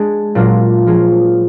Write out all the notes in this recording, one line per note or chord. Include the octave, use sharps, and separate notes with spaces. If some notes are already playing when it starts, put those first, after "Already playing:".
Already playing: G#3 D4 G#4
A#2 F#3 D4 F4 A#4
F3 A#3 F4 G#4